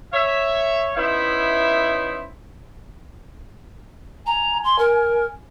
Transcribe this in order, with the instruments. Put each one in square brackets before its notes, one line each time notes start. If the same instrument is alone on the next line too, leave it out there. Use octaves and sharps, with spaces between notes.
[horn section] C#5 E5
B3 C#4 D#4 E4 C5 E5
[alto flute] G#5 [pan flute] A#5
[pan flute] C6
A#4